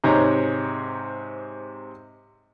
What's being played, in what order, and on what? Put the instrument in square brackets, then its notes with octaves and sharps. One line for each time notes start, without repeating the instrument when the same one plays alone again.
[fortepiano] G#2 C3 G#3 C#5 A#5